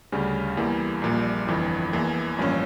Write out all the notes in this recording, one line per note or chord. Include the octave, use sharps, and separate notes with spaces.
D2 C#3 G3 C#4
E2 E3 G3 A#3
A#1 A#2 G3 A#3
G1 F2 E3
E2 E3 A#3
A1 G2 F3 A#3 C#4